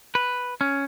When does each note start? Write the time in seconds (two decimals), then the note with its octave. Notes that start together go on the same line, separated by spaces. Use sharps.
0.15 B4
0.61 C#4